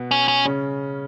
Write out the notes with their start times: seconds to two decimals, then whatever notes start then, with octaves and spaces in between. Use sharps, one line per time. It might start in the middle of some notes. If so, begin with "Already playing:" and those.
Already playing: B2 B3
0.11 C#4
0.28 C#4
0.45 C#3 C#4